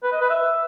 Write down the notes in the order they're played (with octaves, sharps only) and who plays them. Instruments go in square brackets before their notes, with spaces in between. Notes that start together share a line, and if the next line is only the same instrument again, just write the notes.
[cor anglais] B4
D#5
B4
E5